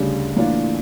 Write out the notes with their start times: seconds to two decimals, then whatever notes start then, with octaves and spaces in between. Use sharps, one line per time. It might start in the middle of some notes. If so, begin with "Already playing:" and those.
Already playing: D2 C#3 G3 D4
0.36 A2 E3 A#3 D4 F4